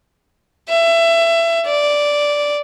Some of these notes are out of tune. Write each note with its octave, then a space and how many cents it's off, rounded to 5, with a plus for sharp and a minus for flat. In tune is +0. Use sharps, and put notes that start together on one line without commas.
E5 +25
D5 -5